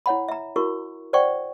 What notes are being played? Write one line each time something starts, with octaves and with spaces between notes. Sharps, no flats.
E4 C#5 F#5 B5
E5 A#5
E4 F#4 A#4 C#6
C5 D5 F#5 G5 C#6